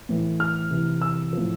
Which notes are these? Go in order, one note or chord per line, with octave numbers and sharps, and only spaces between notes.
A2 E3
F6
C3 E3
E6
A2 F3